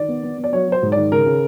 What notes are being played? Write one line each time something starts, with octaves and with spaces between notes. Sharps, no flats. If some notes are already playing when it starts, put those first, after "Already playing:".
Already playing: D#3 D5
B3
B3
B3
D5
F#3 C#5
F#3 C5
G#2
D5
D#3
C#3 A#4
C#3